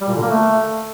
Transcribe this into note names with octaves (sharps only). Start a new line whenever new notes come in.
G3
A#2
D3
A#3
A3